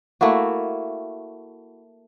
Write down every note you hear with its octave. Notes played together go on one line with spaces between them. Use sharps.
A3 A#3 E4 F#4